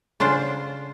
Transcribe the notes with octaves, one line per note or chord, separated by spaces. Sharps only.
C#3 D4 F4 C5